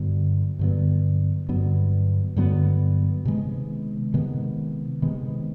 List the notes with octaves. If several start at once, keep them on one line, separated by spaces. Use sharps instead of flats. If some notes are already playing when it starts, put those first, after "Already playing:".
Already playing: G2 D3 F#3 B3
G2 D3 F#3 B3
G2 D3 F#3 B3
G2 D3 F#3 B3
C3 D#3 G#3 B3
C3 D#3 G#3 B3
C3 D#3 G#3 B3